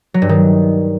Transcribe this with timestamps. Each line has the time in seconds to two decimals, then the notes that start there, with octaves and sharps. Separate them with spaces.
0.14 F#3
0.22 G2
0.29 D#3